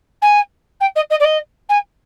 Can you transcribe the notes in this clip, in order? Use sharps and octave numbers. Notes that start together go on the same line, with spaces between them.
G#5
G5
D#5
D#5
D5
D#5
G#5